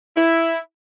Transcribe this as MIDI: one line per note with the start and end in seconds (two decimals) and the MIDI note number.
0.16 0.58 64